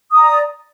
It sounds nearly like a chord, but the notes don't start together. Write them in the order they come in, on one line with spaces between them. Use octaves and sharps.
D#6 A#5 D5